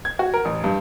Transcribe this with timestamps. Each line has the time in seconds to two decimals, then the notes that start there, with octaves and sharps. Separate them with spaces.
0.05 G#6
0.19 F#4
0.34 A#4
0.45 A1
0.64 G2